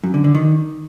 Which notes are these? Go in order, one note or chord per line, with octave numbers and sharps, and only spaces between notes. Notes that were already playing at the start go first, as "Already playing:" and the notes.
F#2
D3
D3
D#3